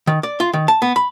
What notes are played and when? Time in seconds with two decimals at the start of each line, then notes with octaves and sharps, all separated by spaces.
0.07 D#3
0.23 D5
0.40 F4
0.53 D#3
0.68 A5
0.82 B3
0.96 B5